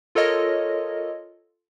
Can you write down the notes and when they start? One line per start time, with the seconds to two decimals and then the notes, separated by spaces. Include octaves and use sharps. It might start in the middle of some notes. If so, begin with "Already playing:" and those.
0.15 F4 A4 A#4 C#5 D#5